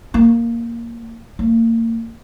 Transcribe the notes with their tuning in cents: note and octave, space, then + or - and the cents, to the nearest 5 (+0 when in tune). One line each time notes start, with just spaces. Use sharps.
A#3 -5
A#3 -35